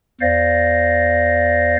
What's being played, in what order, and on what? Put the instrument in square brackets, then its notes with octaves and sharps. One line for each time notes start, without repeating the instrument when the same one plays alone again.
[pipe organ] E2 C5 D5 F5 A6 A#6